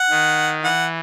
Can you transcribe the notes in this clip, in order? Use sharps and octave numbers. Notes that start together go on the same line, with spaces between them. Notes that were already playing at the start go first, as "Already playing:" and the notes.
Already playing: F#5
D#3
E3 F#5